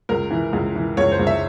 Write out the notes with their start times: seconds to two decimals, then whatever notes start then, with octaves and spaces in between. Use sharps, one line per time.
0.09 C#2 A#4
0.30 E3
0.53 C#2
0.75 E3
0.97 C#2 C#5
1.12 C5
1.19 C#2
1.27 E5